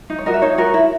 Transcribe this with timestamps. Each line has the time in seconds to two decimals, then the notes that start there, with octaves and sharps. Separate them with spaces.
0.10 D#4
0.18 C#5
0.26 F#4 A#4 D#5
0.34 E5
0.42 D#4 C#5
0.58 F#4 A#4
0.74 E4